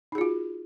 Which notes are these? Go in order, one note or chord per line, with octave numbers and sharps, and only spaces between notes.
D#4 F4 F#4 G#4